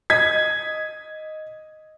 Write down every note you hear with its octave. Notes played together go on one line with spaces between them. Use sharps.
D#5 G#6 B6